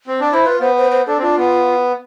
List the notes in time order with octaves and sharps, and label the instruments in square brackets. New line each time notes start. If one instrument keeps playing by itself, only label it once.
[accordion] C4
[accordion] D4 [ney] D5
[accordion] E4 [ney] C5
[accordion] F4 [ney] B4
[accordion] B3 [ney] C5
[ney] C5
C5
[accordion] D4 [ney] A4
[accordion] C4
[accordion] D4 [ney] F4
[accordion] B3